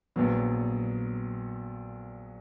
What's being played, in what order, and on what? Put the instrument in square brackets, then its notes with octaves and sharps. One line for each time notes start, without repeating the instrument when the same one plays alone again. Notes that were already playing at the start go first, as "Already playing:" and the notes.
[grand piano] A#1 A#2 F#3 B3